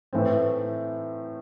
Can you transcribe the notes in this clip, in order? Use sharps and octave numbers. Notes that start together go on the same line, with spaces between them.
A2 E3 A3 C4